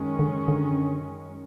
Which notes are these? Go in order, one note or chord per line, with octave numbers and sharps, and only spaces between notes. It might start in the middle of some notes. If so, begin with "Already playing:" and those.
Already playing: F#2 D#3 G#3 C#4
D3
D3